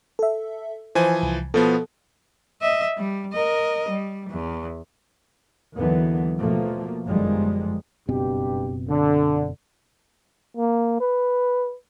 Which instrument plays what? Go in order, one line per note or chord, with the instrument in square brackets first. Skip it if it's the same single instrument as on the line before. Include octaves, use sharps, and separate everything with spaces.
[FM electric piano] A4 E5
[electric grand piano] E3 F3 G#5 [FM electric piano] C5
[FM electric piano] C2
[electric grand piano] B2 F3 B3 [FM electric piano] A4
[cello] D#5 E5
G3
A#4 D#5
G3
E2
[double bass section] D#2 D3 E3 F#3 B3
B2 F3 A3 A#3
G1 F#2 D#3 F3 G3 G#3
[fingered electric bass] F#1 B2 C4 [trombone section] G2 G4
[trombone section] D3
[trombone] A#3
B4